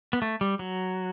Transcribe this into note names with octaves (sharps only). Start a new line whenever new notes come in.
B3
A3
G3
F#3